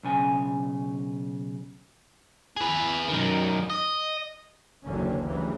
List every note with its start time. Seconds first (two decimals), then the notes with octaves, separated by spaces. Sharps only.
0.03 B1 C#3 G#5
2.56 G#4 B4
3.08 F#2 D#3
3.70 D#5
4.85 F#1 D#2 D3 F#3 C#4
5.26 D2 C#3 E3 F#3 G3